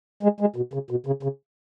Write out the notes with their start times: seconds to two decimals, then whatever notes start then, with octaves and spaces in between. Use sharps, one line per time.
0.23 G#3
0.41 G#3
0.56 B2
0.73 C#3
0.91 B2
1.06 C#3
1.23 C#3